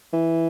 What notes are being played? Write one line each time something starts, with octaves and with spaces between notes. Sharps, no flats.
E3